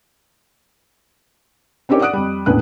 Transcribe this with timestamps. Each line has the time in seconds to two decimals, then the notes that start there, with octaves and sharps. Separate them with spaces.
1.89 C4 C#4 D#4 G4 A#4 C#5
2.01 D5 F#5 D#6 F#6 D7
2.13 F2 G3
2.46 E1 A#1 A2 C#4 B4 F#6